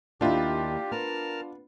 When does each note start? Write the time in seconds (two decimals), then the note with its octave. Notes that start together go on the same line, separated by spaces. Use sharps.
0.21 D#2 D4 E4 F4 G4
0.91 B3 A#4 A5 F6